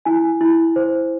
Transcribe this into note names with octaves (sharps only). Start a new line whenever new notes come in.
E4 G#5
E4
C5